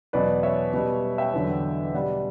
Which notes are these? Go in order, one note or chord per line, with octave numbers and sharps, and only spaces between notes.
E2 B2 F#3 B4 D5
C#5 E5
B2 G3
E5 G5
E2 D3 F#3
B2 G3 D5 F#5